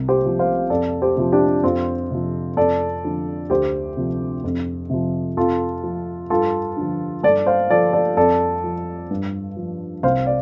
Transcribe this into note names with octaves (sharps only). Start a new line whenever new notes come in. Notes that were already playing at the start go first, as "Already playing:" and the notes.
Already playing: C2
G4 C5
C3 F3
C5 F5
F2 A4 D5
G4 C5
C3 F3
D4 G4
F2 C4 F4
C3 F3
F2 A4 D5
D3 F3
D2 G4 C5
C3 F3
F2
C3 F3
F2 F4 A4
F3
G2 F4 A4
D3 F3
G2 A4 D5
C5 F5
F3 A4 D5
A4 D5
F2 A4 D5
F3
G2
F3
C2 C5 F5
D5